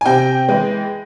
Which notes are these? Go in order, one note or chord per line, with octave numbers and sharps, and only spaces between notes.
G#5
C3 G5
E3 G#3